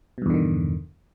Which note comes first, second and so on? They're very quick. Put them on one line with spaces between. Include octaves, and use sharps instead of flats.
B2 G2 E2 D3 D#3